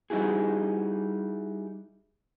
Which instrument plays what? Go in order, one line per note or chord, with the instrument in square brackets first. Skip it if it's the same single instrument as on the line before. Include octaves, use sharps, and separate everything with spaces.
[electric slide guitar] G3 D#4 E4 F#4 G#4